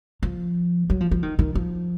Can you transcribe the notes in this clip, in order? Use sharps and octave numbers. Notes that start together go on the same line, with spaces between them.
F3
F#3
F3
F3
D#3
D#3
F3